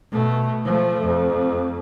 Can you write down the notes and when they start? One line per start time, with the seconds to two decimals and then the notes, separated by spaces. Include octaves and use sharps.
0.11 B2 A3
0.65 F3 A3
1.04 F2